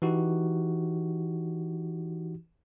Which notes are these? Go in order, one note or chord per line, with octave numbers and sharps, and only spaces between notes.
E3 D#4 F#4 G4